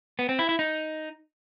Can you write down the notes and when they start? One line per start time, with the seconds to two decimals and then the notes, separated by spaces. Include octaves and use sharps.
0.19 B3
0.29 C4
0.39 E4
0.49 E4
0.59 D#4